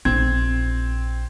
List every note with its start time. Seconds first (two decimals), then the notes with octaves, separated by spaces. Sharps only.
0.05 A#1 C4 G#6